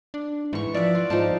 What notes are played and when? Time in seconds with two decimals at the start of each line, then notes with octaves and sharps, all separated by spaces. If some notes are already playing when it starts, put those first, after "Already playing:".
0.14 D4
0.53 G#2 E3 C#6
0.74 F3 D5 E5 F#5
0.95 F4
1.10 G#2 F3 D#4 A5